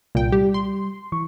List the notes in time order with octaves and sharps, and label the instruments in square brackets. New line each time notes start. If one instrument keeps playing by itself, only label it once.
[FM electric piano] C2 [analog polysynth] A#2 G5
[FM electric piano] G3 [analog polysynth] G4
[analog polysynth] C6
[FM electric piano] E3 C#6